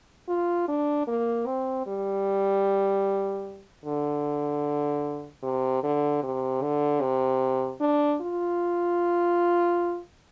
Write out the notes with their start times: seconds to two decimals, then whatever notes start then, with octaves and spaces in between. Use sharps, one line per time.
0.29 F4
0.68 D4
1.08 A#3
1.46 C4
1.87 G3
3.85 D3
5.43 C3
5.83 D3
6.23 C3
6.62 D3
7.01 C3
7.81 D4
8.21 F4